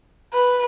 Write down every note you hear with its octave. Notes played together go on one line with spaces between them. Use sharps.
B4